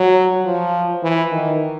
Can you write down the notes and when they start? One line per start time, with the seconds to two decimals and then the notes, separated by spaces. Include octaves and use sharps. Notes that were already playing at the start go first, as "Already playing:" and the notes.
Already playing: F#3
0.45 F3
1.03 E3
1.32 D#3